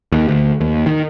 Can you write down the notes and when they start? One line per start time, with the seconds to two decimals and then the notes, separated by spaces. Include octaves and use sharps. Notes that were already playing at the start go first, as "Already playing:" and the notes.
0.12 D#2
0.28 D2
0.60 D#2
0.86 D#3